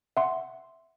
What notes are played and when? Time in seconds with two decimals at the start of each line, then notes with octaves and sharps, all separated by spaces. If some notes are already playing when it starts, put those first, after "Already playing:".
0.17 E5 F#5 C6